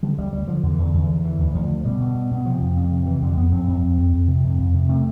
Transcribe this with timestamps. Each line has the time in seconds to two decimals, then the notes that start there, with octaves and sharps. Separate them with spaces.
0.03 D3 G3
0.18 D2 G3
0.33 D2 G3
0.48 D3 F3
0.63 E2 D3
0.73 E3
0.79 E2 D3
0.94 E2
1.10 E2
1.24 D3 E3
1.40 D2
1.54 D2 F3
1.70 D3
1.85 B2 G3
2.00 B2
2.15 B2
2.31 B2
2.45 C3 F3
2.62 F2
2.77 F2
2.91 C3
3.06 C3 E3
3.22 F2 D3
3.37 F2 B3
3.53 F2 C4
3.68 F2
3.83 F2
3.98 F2
4.13 F2
4.28 C3
4.44 F2
4.59 F2
4.74 C3
4.89 C3 A3